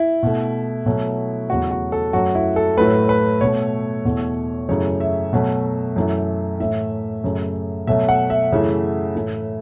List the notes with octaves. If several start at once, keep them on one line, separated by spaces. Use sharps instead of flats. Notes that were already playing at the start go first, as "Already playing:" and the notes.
Already playing: E4
B2 A3
B2 F#3 A3
E2 C#3 F#3 A3 F#4
F#4
A4
F#2 F#3 A3 F#4
E4
A4
A2 F#3 A3 B4
B4
B2 A3 C#5
E2 B2 A3
F#2 C#3 E3 A3 C#5
E5
B2 F#3 A3
F#2 E3 A3
A2 E3 A3 E5
F#2 C#3 A3
B2 F#3 A3 E5
F#5
E5
F#2 C#3 E3 A3
A2 E3 A3